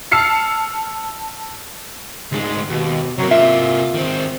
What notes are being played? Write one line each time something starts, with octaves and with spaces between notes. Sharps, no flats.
A5 E6 F6 C7 C#7
D2 G#2 G#3
D#2 B2
C3 F#3 A#3
F4 E5
D#3 C4